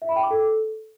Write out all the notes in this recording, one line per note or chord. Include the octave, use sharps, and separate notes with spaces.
E5
B5
G5
D6
A4